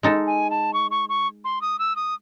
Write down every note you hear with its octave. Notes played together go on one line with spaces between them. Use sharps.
G#3 D#4 A4
G#5
A5
C#6
C#6
C#6
C6
D#6
E6
D#6